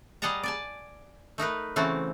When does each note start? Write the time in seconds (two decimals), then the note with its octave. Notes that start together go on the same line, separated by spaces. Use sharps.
0.22 G3 G#4 D#5 F#5 A5 A#5
0.43 D5 G#5 A5
1.38 A3 D#4 A#4 B4
1.76 C#3 E3 A3 C4 F#4 A5